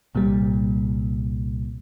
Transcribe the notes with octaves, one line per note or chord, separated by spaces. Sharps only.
C2 A#2 G3